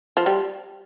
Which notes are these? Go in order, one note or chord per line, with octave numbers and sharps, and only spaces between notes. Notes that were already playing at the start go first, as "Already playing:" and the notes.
F3
G3